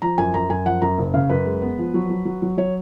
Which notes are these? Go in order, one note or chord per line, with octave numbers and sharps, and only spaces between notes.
F3 A#5
F#2 G#5
F#2 A#5
F#2 G#5
F3 F#5
F#2 A#5
F#1
C#3 F5
F#2 B4
G#3
B3
F3
F#3
F#3
F#3
F#3
F#3 C#5